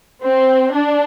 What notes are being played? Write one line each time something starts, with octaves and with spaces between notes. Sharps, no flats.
C4
D4